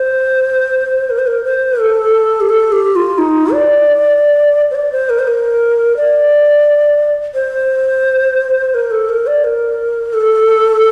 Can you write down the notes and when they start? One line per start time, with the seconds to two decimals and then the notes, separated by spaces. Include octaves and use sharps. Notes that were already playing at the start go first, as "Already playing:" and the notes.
Already playing: C5
1.10 A#4
1.19 C5
1.27 A#4
1.44 C5
1.80 A4
2.41 G4
2.49 A4
2.72 G4
2.96 F4
3.18 D#4
3.53 D5
4.71 C5
4.75 D5
4.92 C5
5.10 A#4
5.19 C5
5.27 A#4
5.97 D5
7.35 C5
8.74 A#4
8.91 A4
9.09 A#4
9.27 D5
9.44 A#4
10.13 A4